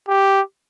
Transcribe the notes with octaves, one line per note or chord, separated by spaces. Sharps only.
G4